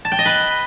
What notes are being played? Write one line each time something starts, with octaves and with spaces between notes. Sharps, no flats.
A5
G5
D#5
B4